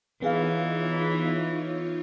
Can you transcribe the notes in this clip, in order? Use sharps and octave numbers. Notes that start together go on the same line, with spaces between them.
E3 B3 D#4 F4 G#4 C#5 F5